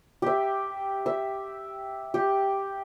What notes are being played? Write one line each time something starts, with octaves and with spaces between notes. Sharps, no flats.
G4 E5
E5
G4